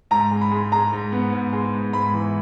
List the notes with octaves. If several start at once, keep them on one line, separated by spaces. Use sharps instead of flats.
G#2 A#5
G#3
B5
G#3
G#3 A#5
G#2
B3
G#2
G#3
G#2
G#2 B5
E3